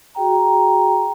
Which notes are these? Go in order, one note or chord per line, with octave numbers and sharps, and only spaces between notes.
F#4 G#4 G5 A#5